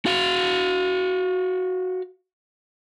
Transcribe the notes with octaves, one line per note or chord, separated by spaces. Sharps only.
F#4 F5